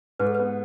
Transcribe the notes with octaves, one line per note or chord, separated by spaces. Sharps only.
G#2 B4
A4
B3 B4